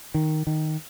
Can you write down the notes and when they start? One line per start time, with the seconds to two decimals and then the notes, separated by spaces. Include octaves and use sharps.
0.14 D#3
0.47 D#3